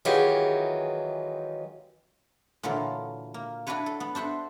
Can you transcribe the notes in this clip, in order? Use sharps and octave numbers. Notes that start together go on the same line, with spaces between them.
D#3 E3 F#3 G#3 F4 G4
A#2 D3 E3 F#3 F4
A#3
D4 E4 F#4 B4 C#5
A4
B3
D4 C5 E5 F#5